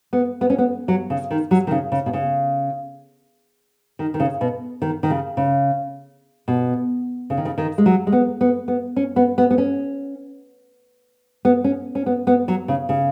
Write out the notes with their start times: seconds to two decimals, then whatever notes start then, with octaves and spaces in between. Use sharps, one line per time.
0.13 B3
0.41 B3
0.50 C#4
0.58 B3
0.88 F#3
1.10 C#3
1.31 D#3
1.51 F#3
1.67 D#3
1.71 C#3
1.92 C#3
2.06 B2
2.13 C#3
3.99 D#3
4.14 D#3
4.20 C#3
4.41 B2
4.82 D#3
5.03 D#3
5.10 C#3
5.37 C#3
6.48 B2
7.30 C#3
7.37 D#3
7.45 C#3
7.58 D#3
7.78 G#3
7.86 F#3
8.07 G#3
8.12 B3
8.41 B3
8.68 B3
8.96 C#4
9.16 B3
9.38 B3
9.51 B3
9.58 C#4
11.45 B3
11.64 C#4
11.95 C#4
12.06 B3
12.27 B3
12.48 F#3
12.68 C#3
12.89 C#3